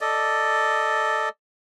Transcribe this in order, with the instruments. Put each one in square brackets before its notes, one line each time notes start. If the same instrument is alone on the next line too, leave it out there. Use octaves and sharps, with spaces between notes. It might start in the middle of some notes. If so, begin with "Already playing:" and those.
[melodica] A4 D5 D#5